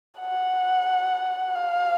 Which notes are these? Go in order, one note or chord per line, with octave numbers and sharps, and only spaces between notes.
F#5
F5